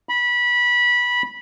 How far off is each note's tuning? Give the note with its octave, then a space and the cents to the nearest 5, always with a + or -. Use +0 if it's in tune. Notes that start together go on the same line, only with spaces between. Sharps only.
B5 -20